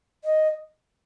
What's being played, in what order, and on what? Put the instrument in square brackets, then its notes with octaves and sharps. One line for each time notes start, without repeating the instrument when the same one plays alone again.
[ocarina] D#5